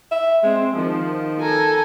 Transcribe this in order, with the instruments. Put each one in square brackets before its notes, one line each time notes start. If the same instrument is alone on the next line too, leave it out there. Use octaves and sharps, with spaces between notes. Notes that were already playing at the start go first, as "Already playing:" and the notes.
[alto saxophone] E5
[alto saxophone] G#3 [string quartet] C4
[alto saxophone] D#3 [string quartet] F3
[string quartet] A4 G#5 A#5